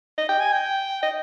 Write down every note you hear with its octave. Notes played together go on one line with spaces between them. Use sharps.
D#5
G5
G#5
G5
D#5